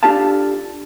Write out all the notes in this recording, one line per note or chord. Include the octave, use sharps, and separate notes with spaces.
D4 F4 G4 A4 F5 A5